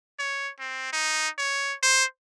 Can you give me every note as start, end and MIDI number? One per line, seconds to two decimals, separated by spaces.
0.19 0.50 73
0.59 0.89 60
0.93 1.29 63
1.38 1.74 73
1.83 2.05 72